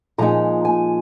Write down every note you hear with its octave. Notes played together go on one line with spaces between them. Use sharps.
A#2 F3 G#3 D#4 A#5
G#5